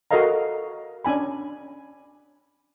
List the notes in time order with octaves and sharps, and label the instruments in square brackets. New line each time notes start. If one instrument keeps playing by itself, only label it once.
[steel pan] F#4 A4 A#4 D#5 F5 A#5
C#4 D4 G#5 B5